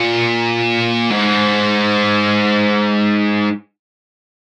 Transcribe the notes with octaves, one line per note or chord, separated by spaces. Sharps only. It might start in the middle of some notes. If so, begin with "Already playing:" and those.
Already playing: A#2
G#2